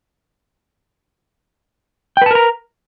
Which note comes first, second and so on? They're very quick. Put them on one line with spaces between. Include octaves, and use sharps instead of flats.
G5 B4 A5 A#4 A#5